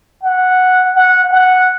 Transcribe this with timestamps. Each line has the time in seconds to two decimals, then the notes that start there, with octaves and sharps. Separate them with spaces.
0.23 F#5
0.94 F#5
1.31 F#5